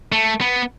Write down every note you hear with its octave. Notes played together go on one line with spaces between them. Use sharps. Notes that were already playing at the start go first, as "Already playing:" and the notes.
A3
B3